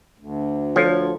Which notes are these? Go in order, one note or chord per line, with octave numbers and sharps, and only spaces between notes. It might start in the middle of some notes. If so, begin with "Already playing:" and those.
D2
F3 A4 C#5